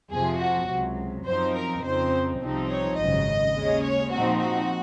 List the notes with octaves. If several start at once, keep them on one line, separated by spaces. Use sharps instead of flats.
F2 C3 F3 G#4
F#4
C#2 C3 F#3
F#2 F3 C4 D#4 C5
A#4
F2 C#3 F3 C4 D#4 C5
C2 C3 F3 C4 D#4
C#5
G#1 F#2 C#3 D#5
D#2 C#3 G#3 C#4
C#5
A#2 F3 C4 D#4 F#4
F#4